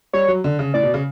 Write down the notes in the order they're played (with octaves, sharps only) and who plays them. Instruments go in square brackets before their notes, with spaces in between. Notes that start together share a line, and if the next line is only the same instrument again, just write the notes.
[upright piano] G3 [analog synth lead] C#5
[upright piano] F#3
D3
C#3
[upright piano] A2 [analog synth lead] D5
[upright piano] B2
C#3